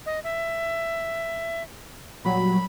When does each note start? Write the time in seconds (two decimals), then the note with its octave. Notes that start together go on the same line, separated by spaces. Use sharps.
0.06 D#5
0.24 E5
2.25 A#2 F#3 G3 B5